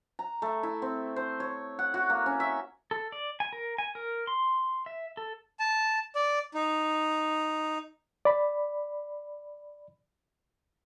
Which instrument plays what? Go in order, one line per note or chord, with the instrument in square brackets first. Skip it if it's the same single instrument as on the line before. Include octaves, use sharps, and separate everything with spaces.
[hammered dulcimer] A#5
A3
E4
C4
C5
C#5
F#5
F#4
A#3
C#4
E5
[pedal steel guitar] A4
D5
G#5
A#4
G#5
A#4
C6
E5
A4
[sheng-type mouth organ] A5
D5
D#4
[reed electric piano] D5 B5